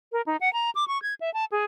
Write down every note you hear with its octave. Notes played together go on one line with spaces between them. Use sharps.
A#4
D#4
F#5
A#5
D6
C#6
G#6
E5
A5
G#4